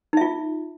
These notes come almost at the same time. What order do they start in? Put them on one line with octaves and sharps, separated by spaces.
D#4 E5 F4